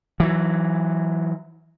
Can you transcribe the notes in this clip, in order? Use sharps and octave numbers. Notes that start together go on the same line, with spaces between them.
E3 F#3